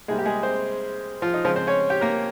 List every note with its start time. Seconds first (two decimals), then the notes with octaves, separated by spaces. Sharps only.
0.08 C3 G3 G#3 A#3 G#4
0.19 G4
0.25 G#3 G#4
0.43 C4 C5
1.22 F3 F4
1.34 D#4
1.44 C#3 F3 G#3 C4 F4
1.56 C4 C5
1.67 C#4 C#5
1.90 G4 G5
2.01 A#3 A#4